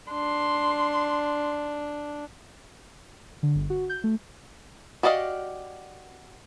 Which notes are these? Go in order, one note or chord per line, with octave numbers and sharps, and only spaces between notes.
D4 C6
D3
G1
F#4
G6
A3
F#4 G4 D5 D#5 F5